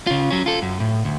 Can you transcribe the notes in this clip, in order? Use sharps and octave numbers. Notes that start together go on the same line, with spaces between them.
C#3 F4
F#3 C#4
F4 A4
F#2
A2
D2